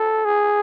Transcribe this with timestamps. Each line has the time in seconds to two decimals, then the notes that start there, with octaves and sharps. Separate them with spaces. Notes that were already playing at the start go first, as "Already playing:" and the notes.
Already playing: A4
0.25 G#4